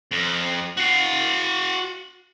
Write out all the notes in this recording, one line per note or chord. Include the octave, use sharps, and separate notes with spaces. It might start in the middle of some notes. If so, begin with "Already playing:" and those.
F2
F#4 F5